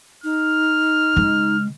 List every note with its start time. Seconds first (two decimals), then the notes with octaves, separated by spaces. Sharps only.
0.24 D#4 F6
1.16 C#3 G#3